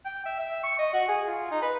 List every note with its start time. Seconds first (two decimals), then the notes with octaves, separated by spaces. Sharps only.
0.05 G5
0.26 E5
0.39 E5
0.64 C#6
0.79 D#5
0.94 F#4
1.09 G#4
1.27 F4
1.51 D#4
1.62 B4